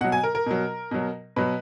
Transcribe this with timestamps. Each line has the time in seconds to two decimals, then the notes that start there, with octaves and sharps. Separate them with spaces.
0.01 B2 F#5
0.04 F#3
0.12 G#5
0.23 A#4
0.35 A#4
0.46 B2 F#3
0.91 B2 F#3
1.36 B2 F#3 B4